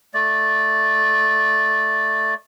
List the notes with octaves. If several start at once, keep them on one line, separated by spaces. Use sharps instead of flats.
A3 D5